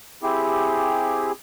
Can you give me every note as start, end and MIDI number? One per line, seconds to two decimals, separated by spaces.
0.23 1.32 60
0.23 1.32 64
0.23 1.32 67
0.23 1.32 68